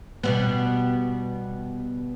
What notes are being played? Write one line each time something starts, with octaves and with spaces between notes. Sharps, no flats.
B2 G3 B3